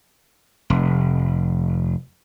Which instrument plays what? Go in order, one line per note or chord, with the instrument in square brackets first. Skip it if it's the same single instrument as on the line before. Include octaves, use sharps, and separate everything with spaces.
[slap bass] F1